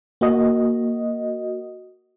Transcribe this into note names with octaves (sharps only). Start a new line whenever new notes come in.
A#3 F#4 D#5